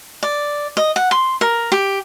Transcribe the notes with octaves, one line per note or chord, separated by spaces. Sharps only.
D5
D#5
F#5
C6
A#4
G4